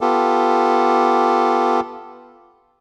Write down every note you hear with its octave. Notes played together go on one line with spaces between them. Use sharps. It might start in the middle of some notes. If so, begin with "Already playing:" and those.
B3 F4 G4 A4